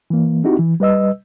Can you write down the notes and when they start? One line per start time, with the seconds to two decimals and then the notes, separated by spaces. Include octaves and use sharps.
0.10 E3 A#3
0.44 C4 D#4 E4 F#4 G4
0.59 E3
0.80 G3 B4 D#5 E6